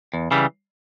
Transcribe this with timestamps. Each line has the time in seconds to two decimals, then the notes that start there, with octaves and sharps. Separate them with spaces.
0.14 E2
0.31 C#3 E3 G3